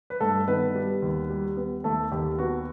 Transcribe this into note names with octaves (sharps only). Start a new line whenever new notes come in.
B4
G2 A3 A4
D#3 B3 B4
G3
D#2
G3
B3
D#2 A3 A4
D#2 G4
B3 F#4